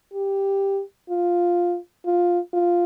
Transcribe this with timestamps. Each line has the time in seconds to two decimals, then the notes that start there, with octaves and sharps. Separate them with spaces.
0.13 G4
1.10 F4
2.06 F4
2.53 F4